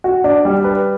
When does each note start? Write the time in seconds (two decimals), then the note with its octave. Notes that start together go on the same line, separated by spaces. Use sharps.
0.04 F#4
0.24 D4
0.45 G3
0.64 B4